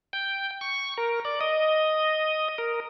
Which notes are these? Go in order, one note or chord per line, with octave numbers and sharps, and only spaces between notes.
G5
C#6
A#4
D5
D#5
A#4